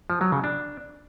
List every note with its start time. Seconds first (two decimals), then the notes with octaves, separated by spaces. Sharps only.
0.10 F3
0.21 F#3
0.32 C#3
0.44 D4